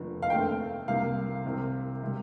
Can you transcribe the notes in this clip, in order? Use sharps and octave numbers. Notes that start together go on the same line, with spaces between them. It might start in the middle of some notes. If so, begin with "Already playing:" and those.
Already playing: F1 D#2 D3 F3
F5
D#2 D3 A3 C4 G5
C2 C3 G3 A#3 F5
C2 C3 G3 C4
C3 G3